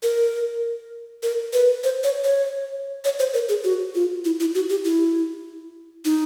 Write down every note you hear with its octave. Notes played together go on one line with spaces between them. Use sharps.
A#4
A#4
B4
C5
C#5
C#5
C#5
C5
A#4
G#4
F#4
F4
E4
E4
F#4
G4
E4
D#4